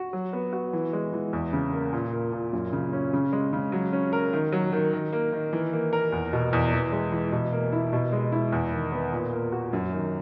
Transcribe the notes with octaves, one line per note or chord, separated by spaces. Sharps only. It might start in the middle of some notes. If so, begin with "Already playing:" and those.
Already playing: F#4
F#3
B3
F#4
E3
G#3
E3
E2
C#3
A#3
A#2
A#3
A#2
F#2
C#3
C#4
C#3
G#3
C#3
F#3
C#4
A#4
D#3
F#3
D#3
D#3
A#3
D#3
E3
A#3
A#4
E2
B2
E2
E3
G#3
E3
B2
A#3
E4
B2
G#3
E4
E2
D#3
B3
A#2
A#3
F#4
F#2
D#3